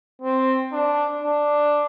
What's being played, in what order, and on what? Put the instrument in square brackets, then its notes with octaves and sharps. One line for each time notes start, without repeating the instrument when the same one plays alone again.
[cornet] C4
D4
D4